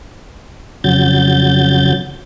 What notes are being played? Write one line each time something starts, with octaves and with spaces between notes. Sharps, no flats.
F2 C#3 F#3 G6 A6